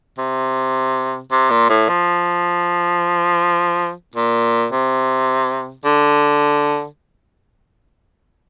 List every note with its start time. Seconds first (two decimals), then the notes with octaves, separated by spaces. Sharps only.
0.18 C3
1.32 C3
1.50 A#2
1.69 A2
1.89 F3
4.15 A#2
4.72 C3
5.85 D3